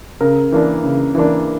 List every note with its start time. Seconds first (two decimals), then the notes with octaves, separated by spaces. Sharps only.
0.21 C#3 A#4
0.52 E3 A#3 D4
0.83 C#3
1.15 E3 A#3 D4